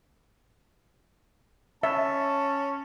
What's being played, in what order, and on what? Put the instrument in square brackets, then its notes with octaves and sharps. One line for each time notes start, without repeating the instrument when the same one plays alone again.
[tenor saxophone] C#4 [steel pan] E5 [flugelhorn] A5